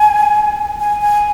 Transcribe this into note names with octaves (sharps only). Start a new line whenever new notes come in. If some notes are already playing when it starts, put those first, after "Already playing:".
Already playing: G#5
G#5
G#5